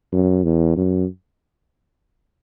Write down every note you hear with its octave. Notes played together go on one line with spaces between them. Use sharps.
F#2
E2
F#2